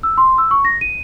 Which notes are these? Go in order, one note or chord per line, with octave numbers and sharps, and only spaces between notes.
E6
C6
E6
C#6
A#6
D#7